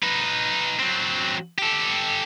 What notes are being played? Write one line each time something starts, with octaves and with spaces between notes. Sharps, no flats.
D#4 B4
F#3 C4
G4 A4